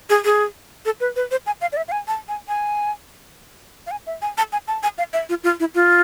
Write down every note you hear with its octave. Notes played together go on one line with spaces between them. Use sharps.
G#4
G#4
A4
B4
B4
C5
G#5
F5
D5
E5
F5
G#5
A5
G#5
G#5
F5
G#5
E5
G#5
A5
G#5
A5
G#5
F5
E5
F4
F4
E4
F4